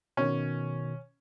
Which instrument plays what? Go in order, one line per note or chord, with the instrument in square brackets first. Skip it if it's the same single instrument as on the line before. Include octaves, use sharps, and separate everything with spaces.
[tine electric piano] B2 D#3 [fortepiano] C#4